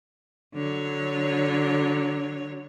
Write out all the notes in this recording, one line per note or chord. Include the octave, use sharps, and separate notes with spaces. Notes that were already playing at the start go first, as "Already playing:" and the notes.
D3 F#3 C#5